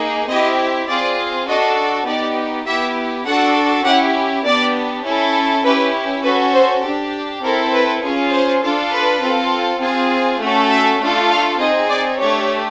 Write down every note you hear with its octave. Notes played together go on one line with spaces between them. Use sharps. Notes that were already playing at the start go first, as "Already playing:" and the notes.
Already playing: A#3 D#4 G#4
C4 E4 G4 D#5
C4 F4 G#4 D5
D4 F#4 A4 D#5
B3 D#4 G4 D5
B3 E4 G4 E5
D4 F#4 A4 F#5
C#4 E4 G4 F#5
B3 D4 G4 D5
C#4 E4 A4
C#4 E4 G4 B4
C#4 F#4 A4 B4
C5
D4 G4
C4 E4 A4 A#4
B4
C#4 F4 G#4
C5
D4 F4 A4
B4
C4 F4 A4
C4 F4 G#4
A3 C#4 F#4 A4
E5
A3 D4 F4 A4
F5
C4 D#4 G#4 D#5
D5
A3 D4 G4 C#5